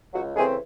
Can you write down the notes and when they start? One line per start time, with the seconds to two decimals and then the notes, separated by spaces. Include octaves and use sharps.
0.14 C#2 F#3 F#4
0.36 C#3 E3 G#3 A3 C4 G#4